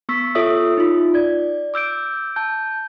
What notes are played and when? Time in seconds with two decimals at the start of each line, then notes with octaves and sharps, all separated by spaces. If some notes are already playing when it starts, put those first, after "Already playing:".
0.09 B3 C#6 E6 B6
0.35 F4 A4 C#5 E5 D#6 E6
0.77 D#4 F4
1.14 D5 G#6
1.74 D6 E6 G6 D7
2.36 A5 G6